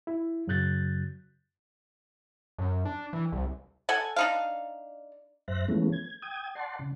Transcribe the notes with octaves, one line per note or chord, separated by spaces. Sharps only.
E4
F#2 C#3 F#3 F#6 G6 A6
F#2
D4
E3
C2
A4 F#5 G#5
D4 D#4 F5
F#2 C5 E5 F#6 A#6
E3 F3 G#3 A3 B3 C#4
G#6
G5 D#6 G#6
D5 F#5 A5 C6
C#3